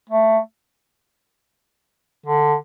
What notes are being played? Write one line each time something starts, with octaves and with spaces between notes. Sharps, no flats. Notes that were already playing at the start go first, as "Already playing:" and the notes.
A3
D3